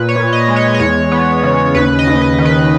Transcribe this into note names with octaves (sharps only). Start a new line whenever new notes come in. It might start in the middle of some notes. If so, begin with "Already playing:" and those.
Already playing: A#2 B4
C#5
A#2
D#5
G#3
C#5
D#5
E2 C#5
B3
C#3
D#2 B4
D#5
D#2
D#5
D#3
B4